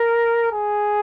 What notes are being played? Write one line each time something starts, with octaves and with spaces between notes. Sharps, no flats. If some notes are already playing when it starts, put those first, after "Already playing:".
Already playing: A#4
G#4